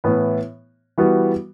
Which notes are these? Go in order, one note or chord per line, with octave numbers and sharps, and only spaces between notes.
A2 E3 B3
E3 G3 B3 F#4